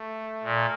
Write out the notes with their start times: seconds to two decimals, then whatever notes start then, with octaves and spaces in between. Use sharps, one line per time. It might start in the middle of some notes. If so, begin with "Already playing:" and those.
Already playing: A3
0.44 A#2